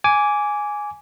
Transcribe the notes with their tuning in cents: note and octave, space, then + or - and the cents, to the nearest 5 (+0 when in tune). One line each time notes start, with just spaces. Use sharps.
G#5 +0 D6 -15